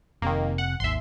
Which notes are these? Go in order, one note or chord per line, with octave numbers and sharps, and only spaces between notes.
F1 C3 D#3 A#3
F#5
G#1 D#2 E5 C6